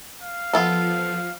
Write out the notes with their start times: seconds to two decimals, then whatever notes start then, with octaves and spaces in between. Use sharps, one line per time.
0.22 F5
0.53 F3 B3 F4 A4